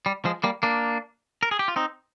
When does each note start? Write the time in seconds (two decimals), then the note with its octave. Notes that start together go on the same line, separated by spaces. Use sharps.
0.06 G3
0.25 F3 G#3
0.44 G3 A#3
0.63 A#3 D4
1.43 A#4
1.51 G#4
1.59 G4
1.68 F4
1.76 C4 D#4